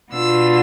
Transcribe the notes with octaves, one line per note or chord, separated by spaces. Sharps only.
B2 B3 D4 F4 E6